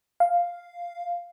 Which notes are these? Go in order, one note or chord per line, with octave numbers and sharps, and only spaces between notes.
F5